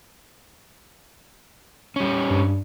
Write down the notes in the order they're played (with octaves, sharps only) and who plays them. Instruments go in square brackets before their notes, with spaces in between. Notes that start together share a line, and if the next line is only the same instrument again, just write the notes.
[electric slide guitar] G3 C#4
[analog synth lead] G2